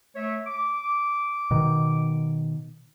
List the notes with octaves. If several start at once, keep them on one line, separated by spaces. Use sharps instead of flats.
A3 C#5 E5
D6
B2 D#3